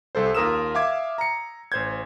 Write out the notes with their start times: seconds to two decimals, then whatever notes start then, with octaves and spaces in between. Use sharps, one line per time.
0.15 C2 A4 C5
0.35 D#2 F4 A#4 D#6 E6 E7
0.74 E5 F5 D6 G#6
1.18 A#5 C#7
1.72 A1 C5 G6 G#6